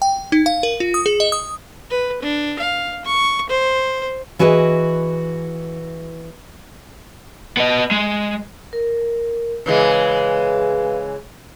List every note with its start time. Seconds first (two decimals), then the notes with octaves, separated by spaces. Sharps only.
0.02 G5
0.32 D#4
0.46 F5
0.63 A#4
0.80 F4
0.94 D#6
1.06 G#4
1.20 D#5
1.32 D#6
1.90 B4
2.22 D4
2.59 F5
3.05 C#6
3.49 C5
4.39 E3 F#4 G#4 B4 D#5
7.57 B3 D#5
7.91 G#3
8.73 A#4
9.66 C#3 E3 G#3 B4 F5